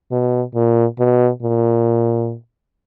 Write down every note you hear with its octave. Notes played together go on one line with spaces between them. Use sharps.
B2
A#2
B2
A#2